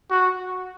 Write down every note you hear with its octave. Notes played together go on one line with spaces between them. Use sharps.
F#4